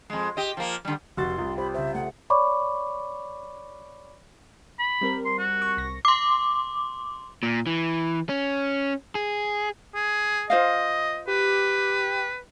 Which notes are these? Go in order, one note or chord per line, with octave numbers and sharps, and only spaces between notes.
F2 G#3
G4 D#5
F3 A#3
D3 G3
F1 F#4 C6 A6
C2 F4 G4
G4 C5 B5
C#3 C5 E5
A3 F#5
C#5 D5 B5 C#6 D6
B5
G3 C4 A#4
C6
F#4
C#6
C2 A#6
C6 D6
A#2
E3
C#4
G#4
G#4
F4 C5 D#5 F5
G4 B4